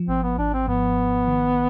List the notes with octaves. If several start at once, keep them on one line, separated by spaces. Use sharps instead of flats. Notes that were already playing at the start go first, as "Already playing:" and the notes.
Already playing: F3
G#1 C4
B3
G#1 D4
C4
G#2 B3
G#1
D#3